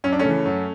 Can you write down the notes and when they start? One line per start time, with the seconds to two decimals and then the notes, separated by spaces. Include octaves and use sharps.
0.04 F#2 C#4
0.13 D4
0.19 A3 C#4
0.25 C#3 E3
0.46 F#2